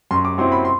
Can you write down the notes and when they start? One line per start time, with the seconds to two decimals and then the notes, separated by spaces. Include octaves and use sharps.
0.11 F#2 C6
0.25 D6
0.38 F#3 C4 E4 C6
0.52 B5
0.65 C6